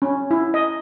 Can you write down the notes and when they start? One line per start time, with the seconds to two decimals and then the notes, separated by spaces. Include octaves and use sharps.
0.02 C#4
0.31 E4
0.54 D#5